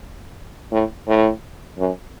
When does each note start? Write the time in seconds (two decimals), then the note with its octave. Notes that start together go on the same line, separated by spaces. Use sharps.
0.72 A2
1.07 A2
1.78 F#2